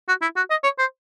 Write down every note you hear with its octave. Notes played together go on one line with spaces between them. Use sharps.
F#4
E4
F#4
D#5
C#5
C5